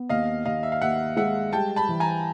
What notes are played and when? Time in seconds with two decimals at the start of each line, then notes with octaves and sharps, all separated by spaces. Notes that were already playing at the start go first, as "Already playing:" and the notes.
Already playing: B3
0.09 D#2 D#5 F5
0.45 D#2 D#5 F5
0.63 E5
0.72 F5
0.82 D#2 E5 F#5
1.17 G#3 E5 F#5
1.53 G3 G5 A5
1.76 A5 B5
1.89 E3
2.00 G#5 A#5